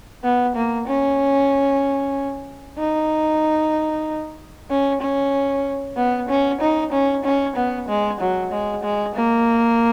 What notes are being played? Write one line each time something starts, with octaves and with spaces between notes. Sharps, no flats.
B3
A#3
C#4
D#4
C#4
C#4
B3
C#4
D#4
C#4
C#4
B3
G#3
F#3
G#3
G#3
A#3